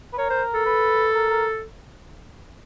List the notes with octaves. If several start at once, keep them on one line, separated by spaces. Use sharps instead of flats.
B4
A#4 C#5
C5
A4
B4
A#4
A#4